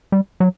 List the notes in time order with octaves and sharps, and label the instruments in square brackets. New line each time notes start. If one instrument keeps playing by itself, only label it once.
[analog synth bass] G3
F#3